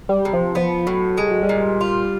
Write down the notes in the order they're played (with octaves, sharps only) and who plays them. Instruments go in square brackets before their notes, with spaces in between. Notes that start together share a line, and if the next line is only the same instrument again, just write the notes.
[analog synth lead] G3
[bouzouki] C3
[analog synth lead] F3
[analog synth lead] F3 [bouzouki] B3
[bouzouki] A2 [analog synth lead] F#3
[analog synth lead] G3 [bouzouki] G#3
[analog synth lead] F#3
G3
[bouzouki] A#2
F4